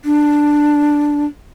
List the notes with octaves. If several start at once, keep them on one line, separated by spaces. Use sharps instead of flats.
D4